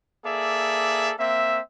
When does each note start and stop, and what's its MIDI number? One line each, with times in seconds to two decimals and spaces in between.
0.25 1.12 58
0.25 1.12 68
0.25 1.12 69
0.25 1.12 74
0.25 1.12 76
1.19 1.60 58
1.19 1.60 60
1.19 1.60 76